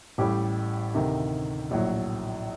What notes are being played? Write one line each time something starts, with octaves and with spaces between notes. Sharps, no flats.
A1 A2 G3 G4
D2 C3 D#3
A#1 A2 F#3